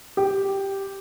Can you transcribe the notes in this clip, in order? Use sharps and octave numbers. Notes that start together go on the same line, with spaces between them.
G4